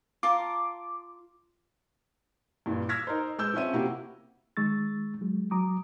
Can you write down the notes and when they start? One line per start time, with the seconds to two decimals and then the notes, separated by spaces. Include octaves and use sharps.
0.23 F4 A5 A#5 D6
2.66 G2 A#2 E3
2.89 E6 F6 G#6 A#6 B6
3.07 D#4 A#4 C5
3.38 G#3 B4 E6 G6
3.54 F3 C4 C#4 E5 D#7
3.73 C3 A#3 E4 F#4 G4
4.57 D#3 G#3 C#6 E6 A6
5.21 F#3 G#3
5.51 F#3 A#5 D6 D#6